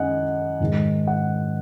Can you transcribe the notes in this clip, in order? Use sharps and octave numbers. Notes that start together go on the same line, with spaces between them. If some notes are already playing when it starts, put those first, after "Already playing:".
Already playing: F#2 D#3 G#3 D#5 F#5 G#5
G#2 D#3 G#3
F#5